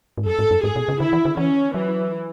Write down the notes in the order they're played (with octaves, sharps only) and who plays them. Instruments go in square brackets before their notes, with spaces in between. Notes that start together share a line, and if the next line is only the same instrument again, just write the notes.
[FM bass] G#2
[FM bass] F#2 [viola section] A4
[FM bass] G#2
F#2
[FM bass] G#2 [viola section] G#4
[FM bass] B2
C#3
[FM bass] D3 [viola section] E4
[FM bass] E3
D3
[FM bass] E3 [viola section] C#4
[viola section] E3 [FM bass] F#3